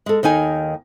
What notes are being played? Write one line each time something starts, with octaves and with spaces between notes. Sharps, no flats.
G#3 A4
D#2 D#3 D#4 G#5